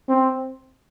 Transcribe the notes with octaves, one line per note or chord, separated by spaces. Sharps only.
C4